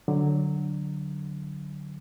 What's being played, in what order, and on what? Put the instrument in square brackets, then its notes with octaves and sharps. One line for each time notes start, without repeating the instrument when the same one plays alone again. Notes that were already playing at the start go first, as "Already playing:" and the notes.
[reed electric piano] D3 F#3